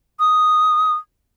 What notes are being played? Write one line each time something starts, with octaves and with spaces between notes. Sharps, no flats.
D#6